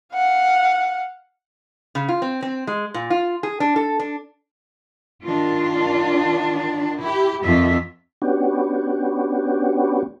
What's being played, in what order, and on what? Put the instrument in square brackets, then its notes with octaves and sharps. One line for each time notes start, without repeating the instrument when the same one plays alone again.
[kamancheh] F5 F#5
[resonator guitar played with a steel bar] C#3
F4
C4
C4
G#3
A#2
F4
G#4
D4
A4
D4
[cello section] D#3 D4 [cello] F4
[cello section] E4 G4
[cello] F2 E5 [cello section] D#3 F4
[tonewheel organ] B3 C#4 D4 F#4 G4